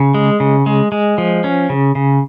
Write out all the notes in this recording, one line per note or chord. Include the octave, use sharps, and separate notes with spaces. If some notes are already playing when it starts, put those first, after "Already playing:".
Already playing: C#3
G#3
C#3
G#3
G#3
F3
C#4
C#3
C#3